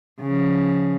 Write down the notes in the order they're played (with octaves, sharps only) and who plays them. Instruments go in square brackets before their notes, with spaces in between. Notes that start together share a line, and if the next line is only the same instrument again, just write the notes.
[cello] C#3 F3